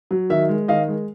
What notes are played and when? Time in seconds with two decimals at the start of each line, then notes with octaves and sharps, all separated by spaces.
0.11 F#3
0.30 D#3 E5
0.49 G#3
0.68 D#3 D#5 F5
0.88 G#3